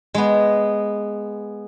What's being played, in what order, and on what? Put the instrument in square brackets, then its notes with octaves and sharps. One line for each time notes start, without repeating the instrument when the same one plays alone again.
[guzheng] G#3 B3